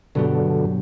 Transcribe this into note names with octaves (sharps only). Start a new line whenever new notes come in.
G2 B2 D3 F#3 B3 D4 G4